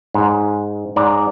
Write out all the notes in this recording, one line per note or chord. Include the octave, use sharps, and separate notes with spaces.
G#2
G#2 D5 A#5